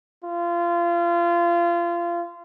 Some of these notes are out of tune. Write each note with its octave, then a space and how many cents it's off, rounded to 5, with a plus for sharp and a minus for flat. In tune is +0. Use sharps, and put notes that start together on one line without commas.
F4 -25